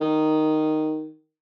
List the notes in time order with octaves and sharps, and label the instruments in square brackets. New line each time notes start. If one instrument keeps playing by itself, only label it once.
[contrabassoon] D#3